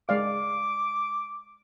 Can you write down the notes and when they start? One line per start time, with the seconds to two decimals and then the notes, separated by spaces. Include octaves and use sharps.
0.09 G#3 D5 F5 D6